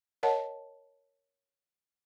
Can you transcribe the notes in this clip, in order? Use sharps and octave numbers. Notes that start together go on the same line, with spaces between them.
A#4 C#5 D#5 F#5 A5